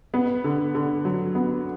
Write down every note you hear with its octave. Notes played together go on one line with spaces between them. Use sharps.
B3
D3
D3
F#3
B3